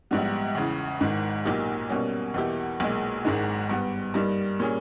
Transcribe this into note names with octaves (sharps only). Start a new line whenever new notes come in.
A#1 G#2 G3 B3
E2 C#3 E3
G#1 G#2 D#3
B1 A#2 A#3 D#4 G4
B2 G3 A#3 C#4
E2 B2 A#3 E4 G4
B1 A#2 G#3
G#1 G#2 D#3 G#3
G2 G3 B3
G2 G3 A#3 D#4
A#2 G3 C#4 G#4